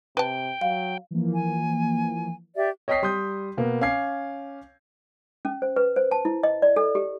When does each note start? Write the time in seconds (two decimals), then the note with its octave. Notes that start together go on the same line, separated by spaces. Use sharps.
0.17 C3 B4 G5 A5
0.61 F#3 F5
1.11 E3 F3 A#3
1.34 G#5
2.56 G4 D5 E5
2.88 C#5 D#5 G5 D#6 B6 C7
3.02 G3 C6 D#6 G6
3.57 B2 A#3 B3
3.81 C#4 F5 G#5 D6 G#6 C7
5.45 C#4
5.62 C5
5.76 B4
5.96 C5
6.11 A5
6.25 E4
6.43 D#5
6.62 D5
6.76 A4
6.95 G4